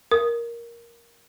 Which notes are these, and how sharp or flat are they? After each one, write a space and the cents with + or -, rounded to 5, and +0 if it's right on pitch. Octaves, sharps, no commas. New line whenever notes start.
A#4 +5 D#6 +0